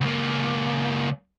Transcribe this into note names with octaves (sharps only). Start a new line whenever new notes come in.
C#2 A#3